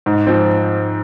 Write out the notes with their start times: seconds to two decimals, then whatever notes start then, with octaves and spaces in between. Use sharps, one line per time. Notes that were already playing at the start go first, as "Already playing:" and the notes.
0.06 G#2
0.27 F3 C4